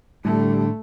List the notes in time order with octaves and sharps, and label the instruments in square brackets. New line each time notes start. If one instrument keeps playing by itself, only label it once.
[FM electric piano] A2 [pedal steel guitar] D3 [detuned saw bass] G3 [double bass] A3